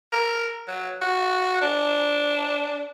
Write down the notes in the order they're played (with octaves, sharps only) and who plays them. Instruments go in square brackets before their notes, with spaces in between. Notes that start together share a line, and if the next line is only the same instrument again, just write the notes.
[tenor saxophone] A#4
F#3
F#4
D4